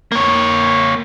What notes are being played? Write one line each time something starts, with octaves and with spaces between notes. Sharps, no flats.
A#3 C#5